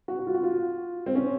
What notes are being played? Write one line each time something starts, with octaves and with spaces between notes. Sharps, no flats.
F#4
F#4
F4
F#4
F4
C4
C#4